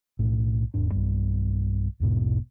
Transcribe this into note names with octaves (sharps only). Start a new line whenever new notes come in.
B1 A2 A3
E1 D#2 G#2 D4
B1 G2
A#1 E2 G#2 B2